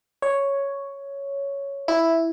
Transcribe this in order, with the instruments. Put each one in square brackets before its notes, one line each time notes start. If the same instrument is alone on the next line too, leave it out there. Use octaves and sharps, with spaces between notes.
[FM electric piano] C#5
E4